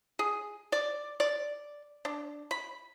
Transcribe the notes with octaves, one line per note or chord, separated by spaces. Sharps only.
G#4
D5
D5
D4
B5